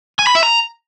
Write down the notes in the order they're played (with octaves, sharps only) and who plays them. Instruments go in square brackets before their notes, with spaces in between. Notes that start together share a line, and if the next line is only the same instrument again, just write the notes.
[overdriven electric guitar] G#5
B5
E5
A#5